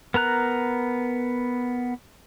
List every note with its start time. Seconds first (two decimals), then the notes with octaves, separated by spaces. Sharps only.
0.14 B3 A#4 A#5 F#6